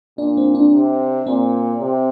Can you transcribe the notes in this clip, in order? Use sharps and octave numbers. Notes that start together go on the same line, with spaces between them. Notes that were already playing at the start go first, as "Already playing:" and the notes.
A#2 D4
C4
D4
C3
A#2 C4
C3